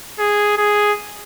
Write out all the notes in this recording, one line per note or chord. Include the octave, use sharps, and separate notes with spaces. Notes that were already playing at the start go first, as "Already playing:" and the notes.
G#4
G#4